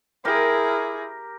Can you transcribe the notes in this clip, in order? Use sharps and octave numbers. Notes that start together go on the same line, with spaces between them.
E4 G4 G#4 A#4